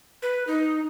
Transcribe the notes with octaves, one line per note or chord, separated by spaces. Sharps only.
B4
D#4